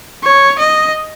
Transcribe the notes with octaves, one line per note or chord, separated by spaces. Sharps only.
C#5
D#5